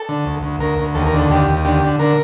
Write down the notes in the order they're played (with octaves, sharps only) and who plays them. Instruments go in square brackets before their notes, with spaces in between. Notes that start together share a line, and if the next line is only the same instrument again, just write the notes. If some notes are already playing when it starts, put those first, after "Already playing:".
Already playing: [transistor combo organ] A4
D3
D2
D2
D2 A#4
D2
D#2 A4
A#4
D3
A4
D#2 G4
D#2
D3 G4
D3
D3 A#4